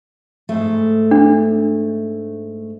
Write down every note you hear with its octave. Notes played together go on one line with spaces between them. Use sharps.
G#2 A3
D4